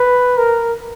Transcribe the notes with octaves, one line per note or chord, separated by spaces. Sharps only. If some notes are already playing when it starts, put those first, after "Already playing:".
Already playing: B4
A#4